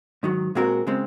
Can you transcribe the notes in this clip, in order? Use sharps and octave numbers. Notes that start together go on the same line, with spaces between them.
G#2 D#3 F#3
A#2 G#3 C4 F#4 A#4
C#3 G#3 C4